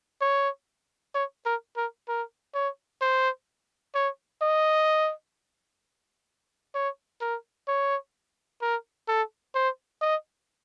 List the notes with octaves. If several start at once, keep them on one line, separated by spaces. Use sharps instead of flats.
C#5
C#5
A#4
A#4
A#4
C#5
C5
C#5
D#5
C#5
A#4
C#5
A#4
A4
C5
D#5